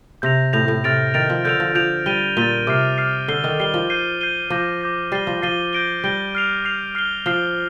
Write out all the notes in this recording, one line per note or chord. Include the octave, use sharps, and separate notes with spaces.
C3 G6 A#6 F7
A2 G6 A#6 F7
A2
C3 F6 A6 D7 F7
D#3 F6 A6 D7 F7
F3
D3 G6 D7 F7
F3
F3 G6 D7 F7
G3 A6 D#7 G7
A#2 A6 D#7 G7
C3 D6 F6 C7
D6 F6 C7
D3 F6 C7 G7
D#3
G3 F6 C7 G7
F3
G6 C7 D#7 G7
G6 C7 D#7 G7
F3 D6 G6 A#6
D6 G6 A#6
G3 A6 C7 D#7 G7
F3
F3 A6 C7 D#7 G7
G6 A#6 D7 G7
G3 G6 A#6 D7 G7
F6 C7 F7
F6 C7 F7
F6 C7 G7
F3 F6 C7 G7